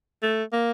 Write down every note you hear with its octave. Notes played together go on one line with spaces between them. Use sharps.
A3
A#3